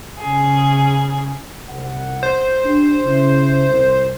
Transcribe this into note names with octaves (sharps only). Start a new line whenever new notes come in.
C#3 G#4
C2 F#5
C5
D4 G4
C#3 E4
C2